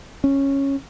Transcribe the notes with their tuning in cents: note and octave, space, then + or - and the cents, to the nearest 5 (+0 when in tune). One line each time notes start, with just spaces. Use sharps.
C#4 -10